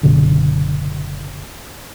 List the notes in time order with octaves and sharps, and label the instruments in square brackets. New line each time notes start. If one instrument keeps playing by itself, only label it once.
[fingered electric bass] F#1 B2 D3